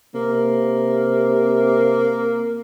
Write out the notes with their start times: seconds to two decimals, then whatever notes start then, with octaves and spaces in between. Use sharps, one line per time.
0.14 C3 A#3